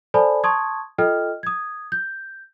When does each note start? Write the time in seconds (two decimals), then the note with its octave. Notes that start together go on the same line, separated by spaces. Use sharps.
0.14 A4 C5 D5 G#5 A5 B5
0.44 A5 C6 C#6 D#6 G#6
0.98 F4 A4 D#5 G5 F6
1.43 D#6 G#6
1.92 G6